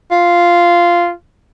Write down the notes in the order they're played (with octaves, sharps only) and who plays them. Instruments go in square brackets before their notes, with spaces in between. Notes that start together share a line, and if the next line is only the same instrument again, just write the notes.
[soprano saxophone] F4